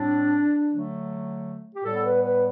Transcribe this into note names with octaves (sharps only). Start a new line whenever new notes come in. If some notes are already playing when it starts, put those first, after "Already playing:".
Already playing: A2 G3 C4 D4
D3 F#3 A3
G4
A2 G3 B3 A4
B4
B4